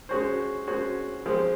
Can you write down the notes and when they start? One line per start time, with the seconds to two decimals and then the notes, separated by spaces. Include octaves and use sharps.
0.09 G#3 C#4 F#4 C5
0.67 G#3 C#4 F#4 C5
1.26 F3 G#3 C4